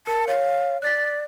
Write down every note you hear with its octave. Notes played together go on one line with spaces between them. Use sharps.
A#4 A5 C#7
C#5 F5
D5 F#6 A6 B6